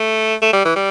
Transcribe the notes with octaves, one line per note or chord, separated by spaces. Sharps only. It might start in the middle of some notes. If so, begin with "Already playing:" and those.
Already playing: A3
A3
G3
E3
G3